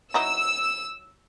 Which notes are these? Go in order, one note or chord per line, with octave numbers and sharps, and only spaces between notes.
F#3 D#4 E4 E6